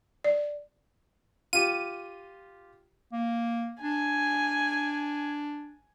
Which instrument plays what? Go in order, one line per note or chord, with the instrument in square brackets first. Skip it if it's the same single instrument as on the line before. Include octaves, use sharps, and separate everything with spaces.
[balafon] D5
[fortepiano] F4 G4 [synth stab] D#7
[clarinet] A#3
[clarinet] D4 [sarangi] G#5